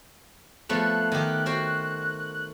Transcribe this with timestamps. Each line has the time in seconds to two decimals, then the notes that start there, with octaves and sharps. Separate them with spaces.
0.69 F3 A3 B3 F#6
1.12 D#3 G4
1.46 F#4 C5 G5